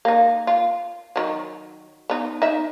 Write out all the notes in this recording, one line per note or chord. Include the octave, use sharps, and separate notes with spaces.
A#3 D#4
F4
D#3 F#3
B3 D#4
D#4 E5